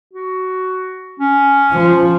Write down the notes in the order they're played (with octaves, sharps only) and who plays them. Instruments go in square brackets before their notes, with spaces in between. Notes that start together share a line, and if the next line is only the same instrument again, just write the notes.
[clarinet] F#4
C#4
[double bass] F3